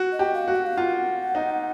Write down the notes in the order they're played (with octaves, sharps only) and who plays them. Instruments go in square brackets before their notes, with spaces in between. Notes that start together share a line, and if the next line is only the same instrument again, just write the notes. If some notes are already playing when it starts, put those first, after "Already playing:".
Already playing: [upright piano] F#4
[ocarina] D#5
[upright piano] G4
[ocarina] F5
[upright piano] F#4
[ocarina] F#5
F5
[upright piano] F4 [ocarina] F#5
[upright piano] D#4